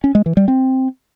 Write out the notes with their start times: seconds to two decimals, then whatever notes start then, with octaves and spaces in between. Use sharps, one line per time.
0.04 C#4
0.15 G#3
0.26 E3
0.37 G3
0.48 C4